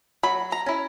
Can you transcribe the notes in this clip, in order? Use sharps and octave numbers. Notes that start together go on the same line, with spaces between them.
F#3 B5
A#5
C#4 E4